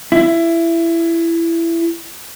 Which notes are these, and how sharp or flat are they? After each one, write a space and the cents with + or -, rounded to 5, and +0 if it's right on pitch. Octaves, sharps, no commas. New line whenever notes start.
E4 +20